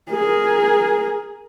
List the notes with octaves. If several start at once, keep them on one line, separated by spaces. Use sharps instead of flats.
G#4 A#4